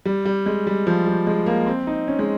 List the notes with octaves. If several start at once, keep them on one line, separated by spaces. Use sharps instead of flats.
G3
G3
G#3
G3
F3
G3
G#3
A#3
C4
D#4
C#4
G#3